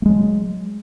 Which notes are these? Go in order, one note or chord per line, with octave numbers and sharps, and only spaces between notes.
F#3 G#3 A3